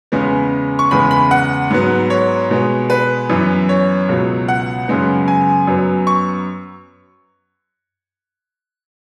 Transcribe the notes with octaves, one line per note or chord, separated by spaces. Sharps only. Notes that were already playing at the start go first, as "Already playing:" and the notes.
E2 C#3 G#3 B3
C#6
E2 C#3 G#3 B3 B5
B5
F#5
G#2 F#3 B3
C#5
B2 G#3 B3
B4
F#2 E3 B3
C#5
C#2 B2 F#3 B3
F#5
F#2 C#3 G#3 B3
G#5
F#2 F#3 B3
C#6